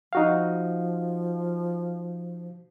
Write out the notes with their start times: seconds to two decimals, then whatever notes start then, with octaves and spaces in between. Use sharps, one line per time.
0.13 F3 D#4 F#4 F5